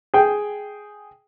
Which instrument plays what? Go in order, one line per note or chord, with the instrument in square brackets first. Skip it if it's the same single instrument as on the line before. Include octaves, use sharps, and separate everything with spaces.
[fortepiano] G#4 G5